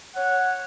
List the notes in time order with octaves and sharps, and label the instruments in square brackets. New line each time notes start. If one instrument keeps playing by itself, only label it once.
[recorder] C#5 [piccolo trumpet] F#5